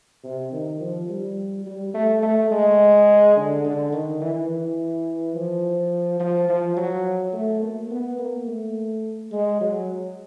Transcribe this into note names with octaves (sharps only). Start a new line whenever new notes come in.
C3
D#3
F3
G3
G3
A3
A3
G#3
D3
D3
D#3
E3
E3
F3
F3
F3
F#3
A3
A#3
B3
A#3
A3
G#3
F#3